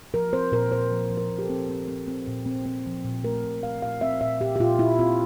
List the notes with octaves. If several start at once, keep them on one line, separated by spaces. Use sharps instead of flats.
F3 A#4
C4 C5
A#2 A#4
A#2 C5
F3
F3
A#4
A#2
G4
A4
C4
C4
C4
C4
A#2
C4
C4
F3
A#2
A3 A#4
A#2
A#2 F5
A#2 F5
C4 E5
A#2 E5
A#2 G4
G4
A#2 F4
A#2 E4
C4 F4